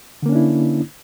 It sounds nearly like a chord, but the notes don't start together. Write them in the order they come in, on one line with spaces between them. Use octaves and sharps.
D3 A#3 C#4 D4 E4